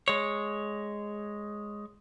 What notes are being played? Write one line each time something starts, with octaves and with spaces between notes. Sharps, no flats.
G#3 C#5